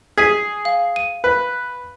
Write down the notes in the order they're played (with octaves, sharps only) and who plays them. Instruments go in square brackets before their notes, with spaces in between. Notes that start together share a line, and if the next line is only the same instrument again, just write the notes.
[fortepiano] G#4 [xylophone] G#6 B6 D#7
[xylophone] F5
D#7
[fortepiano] B4